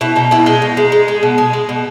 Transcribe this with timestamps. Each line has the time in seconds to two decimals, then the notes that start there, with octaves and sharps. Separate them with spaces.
0.01 B2 E4
0.16 B2 D#4
0.31 B2 E4
0.46 G#3 D#4
0.62 B2
0.77 G#3
0.92 G#3
1.08 G#3
1.23 B2
1.38 G#3
1.53 G#3
1.69 B2